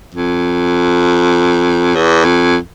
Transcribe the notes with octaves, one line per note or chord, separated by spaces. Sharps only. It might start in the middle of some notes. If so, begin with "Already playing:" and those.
F2
E2
F2